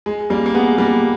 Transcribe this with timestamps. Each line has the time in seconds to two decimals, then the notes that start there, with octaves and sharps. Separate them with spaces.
0.06 G#3
0.30 G3 A#3
0.46 A#3
0.55 G#3 B3
0.78 G3 A#3